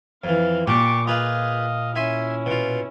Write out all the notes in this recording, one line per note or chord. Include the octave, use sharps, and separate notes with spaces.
F2 E3 F5
A#2 D4 G4 C#6 D6
F4 G#4 B4 D#5 F5
C#4 E4 E5 G#5 C6
B2 F4